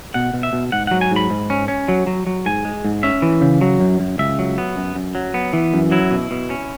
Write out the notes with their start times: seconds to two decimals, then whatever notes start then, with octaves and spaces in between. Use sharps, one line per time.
0.14 B2 F#5
0.34 B2
0.43 E5
0.53 B2
0.72 G#2 F#5
0.87 F#3 F#5
1.01 G#5
1.11 G#2 B5
1.30 G#2
1.50 C#4
1.68 C#4
1.88 F#3
2.07 F#3
2.27 F#3
2.46 G#2 G#5
2.65 G#3
2.85 G#2
3.03 C#4 E5
3.22 E3
3.41 C#3
3.61 F#3
3.80 F#2
4.00 F#2
4.18 C#2 E5
4.39 F#3
4.58 B3
4.76 F#2
4.95 F#2
5.15 F#3
5.34 B3
5.53 E3
5.74 F#2
5.91 F#3 E4
6.11 B2
6.31 B2
6.50 C#4